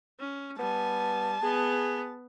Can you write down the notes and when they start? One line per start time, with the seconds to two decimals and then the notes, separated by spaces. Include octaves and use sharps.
0.20 C#4
0.59 G3 B3 G#5 A5
1.43 B3 G#4